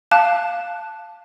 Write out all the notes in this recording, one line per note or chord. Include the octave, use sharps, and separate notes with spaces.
F5 A5 F#6